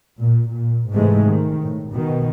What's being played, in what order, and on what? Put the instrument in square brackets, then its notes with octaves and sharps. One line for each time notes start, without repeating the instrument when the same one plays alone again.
[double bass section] A#2
A#2
G#2 C3 E3 G#3 A3
D#3
A2
B2 D#3